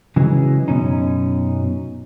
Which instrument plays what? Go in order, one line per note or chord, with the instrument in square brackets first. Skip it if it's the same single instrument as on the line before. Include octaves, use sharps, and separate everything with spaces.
[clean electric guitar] C#3 E3 F#3 G#3
F#2 B2 C#4 D#4